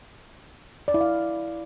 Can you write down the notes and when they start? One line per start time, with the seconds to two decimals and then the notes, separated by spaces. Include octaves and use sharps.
0.88 D5
0.94 E4
1.01 F5